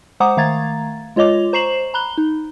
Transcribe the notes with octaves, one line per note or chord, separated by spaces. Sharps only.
G#3 C5 F#5 A#5 D6 D#6
D#3 A3 F5 A#5 G#6 A6
G#3 F4 C#5 D#5 D6 F7
C5 A#5 C#6 C7 E7 F#7
A#5 B5 F#6 G7
D#4